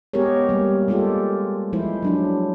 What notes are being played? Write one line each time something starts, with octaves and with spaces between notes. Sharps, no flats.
G#3 B3 G4 G#4 A#4 C#5
G3 A#3
G#3 A#3 F4 G4 A4
F3 G#3 E4 C5
F#3 D4 E4